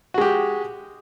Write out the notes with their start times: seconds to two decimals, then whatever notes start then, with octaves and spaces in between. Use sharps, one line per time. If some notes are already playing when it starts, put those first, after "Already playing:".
0.14 F#4
0.18 G#3
0.21 G4